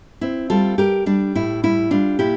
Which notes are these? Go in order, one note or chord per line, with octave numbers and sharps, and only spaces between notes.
C4 E4
G3 F4 A4
G3 G4 A#4
G3 D4
A2 E4
G3 E4
G3 D4 F4
A#2 E4 G4